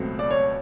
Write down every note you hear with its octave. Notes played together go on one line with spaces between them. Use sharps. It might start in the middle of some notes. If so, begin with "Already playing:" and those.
Already playing: C#2 B2 F#3 A3 C4
D5
C#5